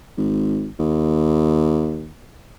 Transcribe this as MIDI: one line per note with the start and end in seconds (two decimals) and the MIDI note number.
0.18 0.69 32
0.79 2.12 39